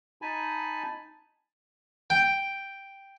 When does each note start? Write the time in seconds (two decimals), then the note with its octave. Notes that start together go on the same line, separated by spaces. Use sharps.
0.22 D#4 G#5 A5 B5
2.10 G5